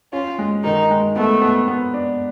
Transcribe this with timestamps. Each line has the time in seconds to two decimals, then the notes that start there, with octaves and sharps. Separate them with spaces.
0.13 C#4 F4
0.39 G#3
0.64 D#3 D#4
0.91 G#3
1.16 A3 B3
1.42 B3
1.68 B3
1.94 D4